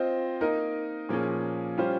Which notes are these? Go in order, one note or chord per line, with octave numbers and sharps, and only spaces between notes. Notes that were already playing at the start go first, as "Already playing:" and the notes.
Already playing: C4 F4 C5 D#5
A#3 D#4 A#4 D#5
A#2 F3 A#3 C#4 G#4
G3 C#4 F4 C5